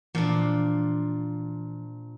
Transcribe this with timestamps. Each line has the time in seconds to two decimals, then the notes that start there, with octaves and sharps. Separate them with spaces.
0.15 A#2 E3 F3 D4